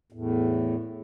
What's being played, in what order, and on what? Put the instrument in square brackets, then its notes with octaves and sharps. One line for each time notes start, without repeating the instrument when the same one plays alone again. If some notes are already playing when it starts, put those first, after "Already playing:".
[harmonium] E2 A2